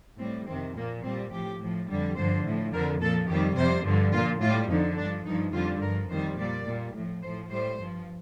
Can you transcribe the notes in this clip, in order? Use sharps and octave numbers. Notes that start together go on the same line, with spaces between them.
A2 G3 C4
F2 C3 D#3 C4
A#2 F3 A#3
A#2 G3 C4
A2 F3 G4
A2 F3
F2 D3 G3
G2 D3 F3 C5
A2 F3
F2 D3 F3 A#4
A#2 F3 A4
F2 D#3 G3 G4
F2 C3 G3 C5
G2 D3 F3
A#2 F3 F4
A2 G3 F4
F2 D3 F3 D#4
G2 F3 D4
G2 F3 D#4
F2 D3 G3 F4
G2 F3 A#4
F2 D#3 G3 C5
A#2 G3 D5
A#2 G3
A2 F3
A2 F3 C5
A2 G3 C5
G2 F3